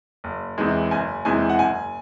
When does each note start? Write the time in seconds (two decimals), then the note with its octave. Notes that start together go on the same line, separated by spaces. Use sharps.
0.24 F#1
0.58 E2 C3 E3 G#3
0.91 F#1 G#5
1.25 E2 C3 E3 G#3 G#5
1.50 F#5
1.59 F#1 G#5